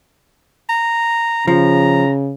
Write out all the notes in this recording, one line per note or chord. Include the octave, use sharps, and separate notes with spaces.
A#5
C#3 F3 A#5